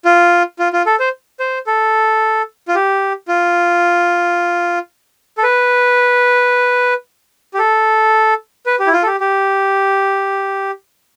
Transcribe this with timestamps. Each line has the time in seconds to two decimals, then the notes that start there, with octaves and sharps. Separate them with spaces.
0.05 F4
0.59 F4
0.73 F4
0.86 A4
1.00 C5
1.40 C5
1.67 A4
2.68 F4
2.75 G4
3.28 F4
5.38 A4
5.43 B4
7.54 G4
7.59 A4
8.66 B4
8.79 G4
8.87 E4
8.93 F4
9.03 A4
9.07 G4
9.20 G4